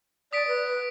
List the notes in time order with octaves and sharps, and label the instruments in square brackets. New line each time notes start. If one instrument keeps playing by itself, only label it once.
[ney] D5 [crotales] D#6 B6 D7
[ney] B4